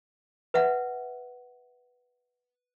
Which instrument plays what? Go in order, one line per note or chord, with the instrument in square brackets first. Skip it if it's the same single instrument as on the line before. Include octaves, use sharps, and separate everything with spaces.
[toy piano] B4 E5 F#5